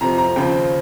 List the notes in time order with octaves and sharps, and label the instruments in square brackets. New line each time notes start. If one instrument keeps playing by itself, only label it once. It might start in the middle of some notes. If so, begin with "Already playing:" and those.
[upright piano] F2 C3 F3 A#5
A#5
D#2 C#3 F3 C4 G5